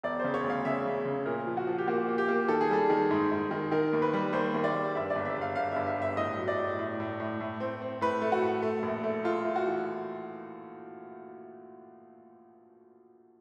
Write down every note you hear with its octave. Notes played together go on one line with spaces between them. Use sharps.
E1 D5
C#3 C5
C#5
D2
F5
C#3 E5
C#3
C#3
A#2 A#4
F3
F#4
F3
G4
A#3 F#4
A#3
G4
A#3
D#3 A4
G#4
G3 A4
D#3
G#2
G#2
D#3
D#3 A#4
D#2
B4
G3
D#2 C5
D#2
D5
G3
G2 E5
D5
G1
E5
G1
F5
G1 F5
G2 E5
E5
G1 E5
A2 D#5
F#3
D5
A2
A2
A2
A2
A2
C4
C4
A2 B4
A3
F#4
A2
A3
A#1
A3
A3 F4
A3
F#4
E3